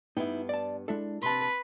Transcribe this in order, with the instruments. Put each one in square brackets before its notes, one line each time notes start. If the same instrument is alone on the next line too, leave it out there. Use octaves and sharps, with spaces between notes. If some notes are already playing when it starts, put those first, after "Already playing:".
[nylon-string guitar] G2 B3 G5 [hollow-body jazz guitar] D#4 E4
[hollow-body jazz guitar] D5 A5
[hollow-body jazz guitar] G#3 E4 A4 [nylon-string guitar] D4
[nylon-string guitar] C3 A5 [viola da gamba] B4 [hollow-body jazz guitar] C6